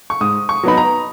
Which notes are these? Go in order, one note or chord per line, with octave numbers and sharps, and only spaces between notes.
C#6
G#2 D#6
C#6
F#3 B3 D#4 B5
A#5